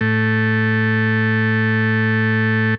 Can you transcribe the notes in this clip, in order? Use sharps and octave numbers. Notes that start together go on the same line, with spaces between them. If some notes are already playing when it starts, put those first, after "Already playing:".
A2 A3